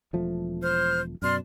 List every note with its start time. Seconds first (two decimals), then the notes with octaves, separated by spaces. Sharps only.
0.13 E1 F3 A3
0.62 C5 F6 G6
1.22 F#2 B2 D5 C6 F6